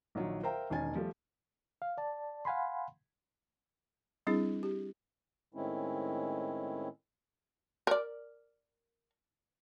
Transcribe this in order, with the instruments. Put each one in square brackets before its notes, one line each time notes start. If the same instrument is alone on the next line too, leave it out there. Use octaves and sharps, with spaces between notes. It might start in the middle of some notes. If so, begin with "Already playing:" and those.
[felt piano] A#1 D#3 F#3
A#4 C5 E5 F5 G5 A#5
E1 D#3 C#4 G#5 A6
F3 G3 A3
[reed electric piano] F5
D5 A5
F5 F#5 G#5 B5 C6
[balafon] G3 C4 D4 E4 G#4
G4
[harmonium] A2 D#3 G#3 C4 C#4 E4
[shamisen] A#4 D5